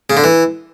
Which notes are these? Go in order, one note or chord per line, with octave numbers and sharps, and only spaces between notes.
C#3
D3
E3